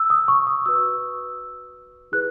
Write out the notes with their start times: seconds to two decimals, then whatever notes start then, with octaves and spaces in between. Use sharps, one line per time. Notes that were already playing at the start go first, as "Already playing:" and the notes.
Already playing: E6
0.10 D#6
0.28 C#6
0.47 D#6
0.66 F#4 B4 E6
2.12 E4 G#4 B4 F#6